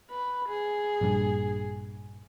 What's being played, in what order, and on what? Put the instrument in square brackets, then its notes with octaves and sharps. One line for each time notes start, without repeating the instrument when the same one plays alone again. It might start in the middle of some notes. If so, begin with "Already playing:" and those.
[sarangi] B4
G#4
[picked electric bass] A#1 G2